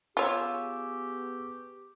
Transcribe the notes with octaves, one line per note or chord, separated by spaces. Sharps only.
B3 F4 G4 G#4 C#5 C#6 E6